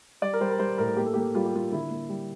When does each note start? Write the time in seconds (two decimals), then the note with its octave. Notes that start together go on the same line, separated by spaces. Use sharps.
0.22 G3 D5
0.33 A#4
0.41 G3 C5
0.50 A#4
0.59 G3 C5
0.78 A2 A#4
0.97 A#3 G4
1.06 A4
1.14 A#3 G4
1.35 G3 F4
1.46 G4
1.54 A#3 F4
1.72 D3 E4
1.91 A#3
2.09 G3